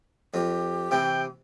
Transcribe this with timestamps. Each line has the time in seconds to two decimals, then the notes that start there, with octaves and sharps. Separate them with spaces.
0.34 F2 G4
0.91 C3 E3 G5